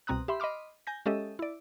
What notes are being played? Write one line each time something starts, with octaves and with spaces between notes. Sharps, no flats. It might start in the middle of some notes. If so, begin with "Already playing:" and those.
C2 B2 C4 A#5 D#6 F#6
G4 E5 B5 C6
D#5 B5 C6 D6 F6
G#5 G6 A#6
G#3 C#4 G4 A4 D#5 E5
E4 D5